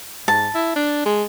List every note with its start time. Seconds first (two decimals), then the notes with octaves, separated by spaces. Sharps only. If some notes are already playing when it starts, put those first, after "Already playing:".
0.28 G#2 A5
0.55 E4
0.76 D4
1.06 G#3